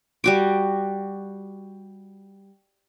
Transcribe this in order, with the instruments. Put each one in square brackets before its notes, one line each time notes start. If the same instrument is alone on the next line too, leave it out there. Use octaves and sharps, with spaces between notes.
[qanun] G3 F#4 D6